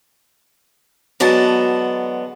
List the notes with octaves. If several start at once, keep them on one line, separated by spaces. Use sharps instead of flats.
D3 F#3 G#3 B3 A5